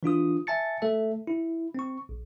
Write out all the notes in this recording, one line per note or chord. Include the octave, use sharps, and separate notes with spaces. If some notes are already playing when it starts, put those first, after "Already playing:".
E3 D4 F4 D#6
E5 G#5 A5 A6 C#7
A3 A4 E5
E4
C4 C#6
A#1